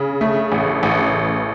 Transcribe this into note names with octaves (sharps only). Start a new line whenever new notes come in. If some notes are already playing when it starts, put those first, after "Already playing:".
Already playing: C#3
A3
A1
A1